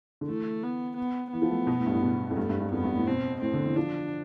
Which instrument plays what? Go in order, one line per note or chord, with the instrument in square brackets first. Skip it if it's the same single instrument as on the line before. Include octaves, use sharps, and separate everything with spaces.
[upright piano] D3
[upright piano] E3 [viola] A3
[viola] B3
B3
[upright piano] E3 [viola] B3
[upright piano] F3
A3
B2
A2
G2
A2
B2
F2
[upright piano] G2 [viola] A3
[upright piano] G2
G2
[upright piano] F2 [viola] B3
[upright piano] G2
A2
[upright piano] B2 [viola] C4
[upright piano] A2 [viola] C4
[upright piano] D3
E3
[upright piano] F3 [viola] D4